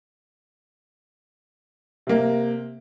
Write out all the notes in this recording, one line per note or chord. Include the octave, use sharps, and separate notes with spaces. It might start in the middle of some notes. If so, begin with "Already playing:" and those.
C3 A#3